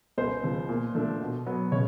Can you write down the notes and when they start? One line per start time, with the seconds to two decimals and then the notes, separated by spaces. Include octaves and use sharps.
0.18 C#2 C5
0.43 C#3 F3
0.69 A#2
0.95 F3 A3 D4
1.21 B2
1.46 F#3 B3
1.72 C#3 C#5